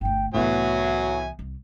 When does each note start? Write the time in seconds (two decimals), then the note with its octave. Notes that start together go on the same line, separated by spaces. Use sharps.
0.01 G1 D2 G5
0.34 C2 A2 E3 F#3 B3 E5 G#5
1.39 C2